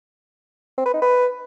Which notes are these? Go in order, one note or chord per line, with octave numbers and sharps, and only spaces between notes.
C4
B4
D#4
B4